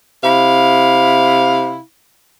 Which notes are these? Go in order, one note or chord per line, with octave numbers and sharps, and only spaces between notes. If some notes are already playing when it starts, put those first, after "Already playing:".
C3 E4 F5